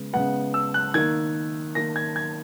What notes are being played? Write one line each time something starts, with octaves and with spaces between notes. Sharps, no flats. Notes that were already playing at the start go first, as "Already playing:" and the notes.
Already playing: C#3 G#3 B3
C#3 G#3 B3 F#5
E6
F#6
D#3 A#3 G#6
D#3 A#3 A#6
G#6
G#6